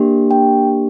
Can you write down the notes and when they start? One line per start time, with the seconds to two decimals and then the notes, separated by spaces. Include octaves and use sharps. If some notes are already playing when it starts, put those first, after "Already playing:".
Already playing: A#3 D4 G4
0.31 G5